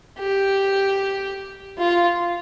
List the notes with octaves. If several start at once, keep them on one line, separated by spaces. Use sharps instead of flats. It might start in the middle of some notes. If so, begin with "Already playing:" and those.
G4
F4